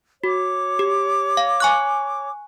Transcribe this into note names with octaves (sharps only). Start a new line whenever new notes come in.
F#4 C#5 D6
G4
F5
G#5 C#6 F#6